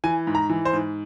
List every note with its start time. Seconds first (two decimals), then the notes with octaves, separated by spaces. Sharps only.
0.04 E3 G#5
0.27 G#2
0.35 A#5
0.49 E3
0.65 C5
0.73 G#2